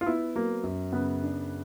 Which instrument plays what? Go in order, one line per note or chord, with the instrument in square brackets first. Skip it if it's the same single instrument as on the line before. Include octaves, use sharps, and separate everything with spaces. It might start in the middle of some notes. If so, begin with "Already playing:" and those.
[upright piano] F4
[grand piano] B3 [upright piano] E4
[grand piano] F#3 [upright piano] A#3
[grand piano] F#2
[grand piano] C#3 [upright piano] B3
[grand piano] D4